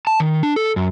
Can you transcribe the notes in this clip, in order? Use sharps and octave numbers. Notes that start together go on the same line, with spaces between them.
A5
D#3
D4
A4
F#2